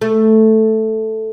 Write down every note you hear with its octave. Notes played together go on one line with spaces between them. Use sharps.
A3